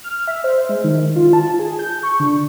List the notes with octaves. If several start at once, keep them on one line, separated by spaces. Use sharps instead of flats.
F6
E5
C5
G#3
D#3
F4
A5
G#4
G6
C#6
D3